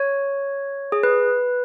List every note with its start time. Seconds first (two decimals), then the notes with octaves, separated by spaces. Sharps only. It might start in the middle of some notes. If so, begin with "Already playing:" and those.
Already playing: C#5
0.92 G#4
1.03 B4